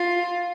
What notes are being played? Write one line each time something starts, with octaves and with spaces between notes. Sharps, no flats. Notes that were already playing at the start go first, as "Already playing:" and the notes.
Already playing: F4